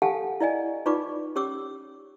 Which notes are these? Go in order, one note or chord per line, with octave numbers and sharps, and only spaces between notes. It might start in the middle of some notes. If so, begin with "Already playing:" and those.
G4 A4 F5 F#5 G#5 A5
E4 D5 D#5 G#5
D#4 F4 B4 D5 C#6 D6
C#4 G4 C#5 D6 E6